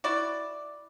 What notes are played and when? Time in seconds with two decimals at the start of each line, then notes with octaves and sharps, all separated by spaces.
0.04 E4 F#4 D5